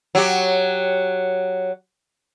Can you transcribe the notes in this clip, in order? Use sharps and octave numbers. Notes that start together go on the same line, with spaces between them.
F#3 G4